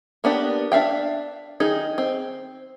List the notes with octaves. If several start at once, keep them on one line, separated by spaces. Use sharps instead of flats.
A#3 B3 D4 G4
D4 E5 F5 G5
D#3 D#4 G#4
C4